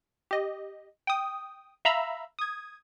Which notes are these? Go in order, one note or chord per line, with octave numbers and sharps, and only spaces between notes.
G4 D#5
G5 D#6
E5 F5 A#5 B5 E6
D#6 G#6